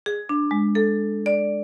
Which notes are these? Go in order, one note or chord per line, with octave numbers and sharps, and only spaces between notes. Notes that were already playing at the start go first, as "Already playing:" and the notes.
G#4
D4
G#3
A4
D5